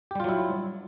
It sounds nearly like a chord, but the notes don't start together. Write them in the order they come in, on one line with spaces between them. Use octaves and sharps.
G4 G3 F4 F#3 E4